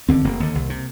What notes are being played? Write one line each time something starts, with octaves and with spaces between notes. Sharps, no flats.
D#2 D3 C4
F1 A#3
D#2 D3
C2
C3